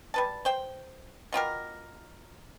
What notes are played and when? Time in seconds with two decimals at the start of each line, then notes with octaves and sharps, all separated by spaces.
0.14 G3 B4 A5
0.45 C5 G5
1.33 B2 F4 G4 A#4